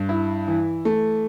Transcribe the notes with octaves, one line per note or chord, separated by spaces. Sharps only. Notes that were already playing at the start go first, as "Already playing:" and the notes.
Already playing: G2
E4
E3
A3